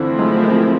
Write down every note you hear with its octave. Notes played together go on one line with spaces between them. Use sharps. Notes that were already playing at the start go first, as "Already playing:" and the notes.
Already playing: D3 E3 F3 A3 C4 E4
F#3 G#3
G#3 A#3